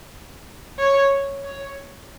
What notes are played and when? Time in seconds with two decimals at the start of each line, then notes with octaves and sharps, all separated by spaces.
0.78 C#5
1.44 C#5